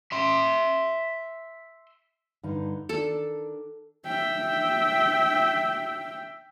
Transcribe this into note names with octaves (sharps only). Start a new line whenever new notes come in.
E5 C6
G2 D3 D#4
D#3 D4 A4
E5 G5